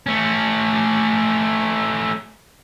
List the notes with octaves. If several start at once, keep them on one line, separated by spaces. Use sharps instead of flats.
A3 C#4